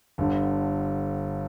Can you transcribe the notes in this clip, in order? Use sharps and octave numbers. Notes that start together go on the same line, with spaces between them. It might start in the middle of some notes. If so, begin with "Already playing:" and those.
G1 G2 D3